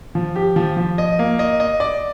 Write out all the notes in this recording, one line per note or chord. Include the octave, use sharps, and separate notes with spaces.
F3
G4
F3
F3
D#5
A#3
D#5
D#5
D5